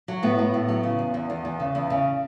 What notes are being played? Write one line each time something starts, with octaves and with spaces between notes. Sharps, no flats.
F#3
A2 B3
A2
A2
F#3
C#3
E2
E2
E2
E2
C#3
E2
C#3